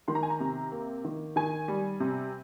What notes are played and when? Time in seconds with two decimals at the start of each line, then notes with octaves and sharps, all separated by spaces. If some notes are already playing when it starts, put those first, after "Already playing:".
0.08 D#3 C6
0.15 A#5
0.23 G#5
0.30 A#5
0.40 C3
0.72 A#3
1.05 D#3
1.36 D#3 G#5
1.68 G3
2.00 C3